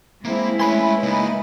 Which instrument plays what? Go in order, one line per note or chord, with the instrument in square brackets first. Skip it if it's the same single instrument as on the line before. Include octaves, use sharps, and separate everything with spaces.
[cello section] G#3 E4 [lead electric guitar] A#3 [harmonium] C4
[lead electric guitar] A3 C6 [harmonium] C#4 B4 [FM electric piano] G#5 B5
[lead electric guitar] C#3 A#3 [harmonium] D#4 B4 D#5